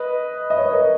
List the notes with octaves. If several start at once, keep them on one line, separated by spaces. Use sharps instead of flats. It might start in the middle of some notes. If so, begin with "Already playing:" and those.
Already playing: B4 D#5
D#5
C#5
B4
A#4 C#5